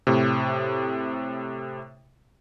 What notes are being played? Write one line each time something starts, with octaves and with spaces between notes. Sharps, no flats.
A2 C3